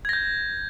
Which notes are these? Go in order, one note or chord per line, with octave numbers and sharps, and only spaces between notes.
G6 G#6 A#6